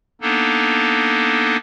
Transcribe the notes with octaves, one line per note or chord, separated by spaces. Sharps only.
A#3 B3 D4 D#4 A4